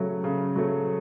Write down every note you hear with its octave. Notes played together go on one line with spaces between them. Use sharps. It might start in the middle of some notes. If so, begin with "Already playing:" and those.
Already playing: C#3 F#3 A3
C#3
F#3 A3